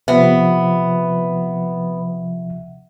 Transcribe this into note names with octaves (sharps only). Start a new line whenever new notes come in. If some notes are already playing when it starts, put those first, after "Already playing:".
C3 F3 B3 E5 F#5